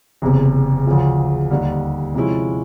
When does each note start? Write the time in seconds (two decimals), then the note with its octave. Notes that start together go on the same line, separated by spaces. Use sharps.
0.22 F#1 E2 C3
0.86 D2 C#3 F3
1.51 D#2 D3 G3
2.14 C3 F3 G#3 C#4 E4